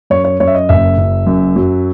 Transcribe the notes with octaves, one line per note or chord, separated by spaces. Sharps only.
F#2 C#5
C#5
F#2 C#5
E5
D#5
F#1 E5
F#1
F#2
F#3